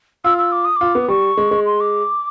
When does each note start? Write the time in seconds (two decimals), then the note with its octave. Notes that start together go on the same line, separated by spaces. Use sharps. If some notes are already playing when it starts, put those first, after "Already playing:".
0.24 F4 E6
0.38 E6
0.52 D6
0.64 D#6
0.76 D6
0.81 F4
0.95 B3
1.08 G3 C#6
1.37 G#3
1.51 G#3
1.66 C6
1.80 D6